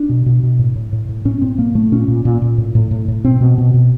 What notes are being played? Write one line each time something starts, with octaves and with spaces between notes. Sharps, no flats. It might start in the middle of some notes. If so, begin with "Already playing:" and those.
Already playing: D4
B2
B2
B2
A2
A2
A2
A2
A2 C#4
A2 C4
A2 A#3
A2 A3
A#2 C#4
A#2
A#2
A#2
A2
A2
A2
A2
B2 C4
B2
B2
B2